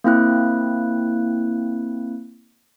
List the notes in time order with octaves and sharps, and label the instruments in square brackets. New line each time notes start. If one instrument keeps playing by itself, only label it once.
[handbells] A#3 C4 E4 F#6